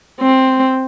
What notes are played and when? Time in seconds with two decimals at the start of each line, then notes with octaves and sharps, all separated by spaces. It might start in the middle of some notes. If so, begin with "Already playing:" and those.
0.21 C4